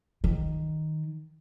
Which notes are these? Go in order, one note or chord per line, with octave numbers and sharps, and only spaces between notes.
D#3